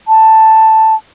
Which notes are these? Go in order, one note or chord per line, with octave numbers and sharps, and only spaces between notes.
A5